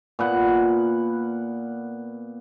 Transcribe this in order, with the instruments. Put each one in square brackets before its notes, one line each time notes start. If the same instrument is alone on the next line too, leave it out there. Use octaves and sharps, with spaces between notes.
[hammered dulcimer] A#2 B3 F#5